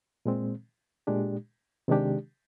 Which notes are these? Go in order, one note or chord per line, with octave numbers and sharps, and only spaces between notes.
A#2 G#3 C4
A#2 G#3 D4 G4
C3 D#3 G#3 D4 G4